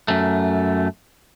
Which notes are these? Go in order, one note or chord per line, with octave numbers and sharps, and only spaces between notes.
F#2 A3